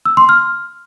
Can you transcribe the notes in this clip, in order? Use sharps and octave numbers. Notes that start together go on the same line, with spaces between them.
E6
C6
F6